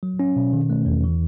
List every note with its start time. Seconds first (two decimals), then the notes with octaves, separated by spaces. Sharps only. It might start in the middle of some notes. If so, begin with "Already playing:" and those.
0.03 F#3
0.20 C#4
0.36 B2
0.53 D#3
0.70 A3
0.86 E2
1.04 E3